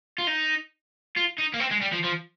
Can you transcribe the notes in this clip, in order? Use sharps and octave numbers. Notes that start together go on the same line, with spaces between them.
F4
D#4
F4
D#4
A#3
C4
G#3
G3
F3
F3